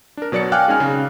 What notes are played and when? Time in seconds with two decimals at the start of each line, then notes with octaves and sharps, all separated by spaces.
0.17 D4 A#4
0.32 B2 F#3 D5 A6 C#7
0.52 F5 G5 G#5 D6 F6 F#6
0.68 G#3 C#4 D#4 G#5 F6
0.80 C#3